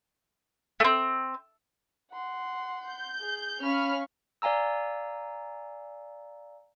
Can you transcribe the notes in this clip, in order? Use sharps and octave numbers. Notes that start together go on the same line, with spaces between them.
A3 C4
F#5 C6
G6
G#4
C#4 F5 B5 C#6 F6
D5 F5 G#5 A#5 E6